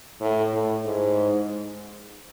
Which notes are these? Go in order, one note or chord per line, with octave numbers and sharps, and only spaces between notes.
A2
A2
G#2